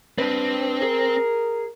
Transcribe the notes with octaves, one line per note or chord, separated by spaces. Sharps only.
C4 D4 B4
G#4 A#4